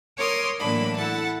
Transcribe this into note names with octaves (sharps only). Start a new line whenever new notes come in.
A#4 C#5 C6 D6 D#6
A2 E3 F#3 A#3 D4 B5
E4 A4 F#5 A5